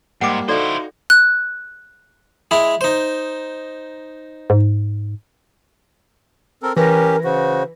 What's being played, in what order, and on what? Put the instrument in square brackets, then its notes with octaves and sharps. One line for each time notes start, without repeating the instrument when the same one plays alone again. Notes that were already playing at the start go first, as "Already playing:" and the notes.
[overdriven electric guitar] G#2 [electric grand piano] G3 A#3 [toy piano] F#5 G5 D6
[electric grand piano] D#4 F#4 F5 [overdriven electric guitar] E4 C5 [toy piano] A4 D5
[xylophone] F#6
[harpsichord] G#3 E4 G#4
D#4 C5
[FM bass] G#2
[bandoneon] C4 A4 A#4
[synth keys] E3 B4 A#6 [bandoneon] C#4 G4 [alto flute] A#4
[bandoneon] C#3 F#4 [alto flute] C5